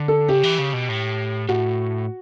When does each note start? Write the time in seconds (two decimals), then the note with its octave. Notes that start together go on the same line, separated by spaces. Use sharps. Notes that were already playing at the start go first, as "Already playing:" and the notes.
Already playing: D3
0.08 A4
0.29 C#3 G4
0.43 E3
0.58 C#3
0.73 B2
0.89 A2
1.49 A2 F#4